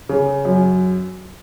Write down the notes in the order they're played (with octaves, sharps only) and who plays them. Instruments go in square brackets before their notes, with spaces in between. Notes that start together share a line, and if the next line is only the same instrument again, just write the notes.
[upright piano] C#3
F#2